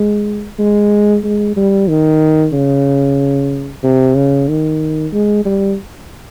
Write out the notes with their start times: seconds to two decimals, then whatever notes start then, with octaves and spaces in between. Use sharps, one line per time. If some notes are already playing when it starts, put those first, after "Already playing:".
Already playing: G#3
0.59 G#3
1.24 G#3
1.57 G3
1.89 D#3
2.53 C#3
3.83 C3
4.16 C#3
4.49 D#3
5.13 G#3
5.45 G3